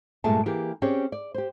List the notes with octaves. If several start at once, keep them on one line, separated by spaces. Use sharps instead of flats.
G2 A#2 G#3 A3 G#4 A5
E3 A#3 G4 G#4
C4 C#4 G4 G#4 D5
D5
G4 C5